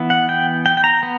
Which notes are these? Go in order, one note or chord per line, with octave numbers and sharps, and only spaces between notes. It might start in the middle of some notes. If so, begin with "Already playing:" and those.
Already playing: E3 B3
F#5
G5
G5
G5
A#5
B3